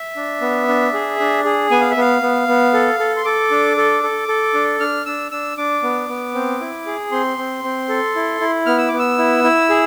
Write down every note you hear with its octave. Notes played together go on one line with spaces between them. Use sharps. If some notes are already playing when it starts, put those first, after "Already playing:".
Already playing: E5
D4
B3
D4
G#4
D4
G#4
B3 G#5
F5
E5
B3 F5
B3
B3
A4
A4
C6
A4 D6
D4
A4
A4
A4
D4
D4 F6
D4 E6
D4 E6
D4 D6
B3
B3
C4
E4
G#4
C4 C6
C4
C4
A4
E4
E4
B3 F6
E6
B3 D6
E6
E4
E4
G#4